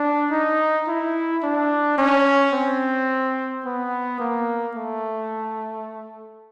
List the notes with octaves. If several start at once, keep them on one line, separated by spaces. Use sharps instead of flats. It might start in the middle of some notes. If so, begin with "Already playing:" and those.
Already playing: D4
D#4
E4
D4
C#4
C4
B3
A#3
A3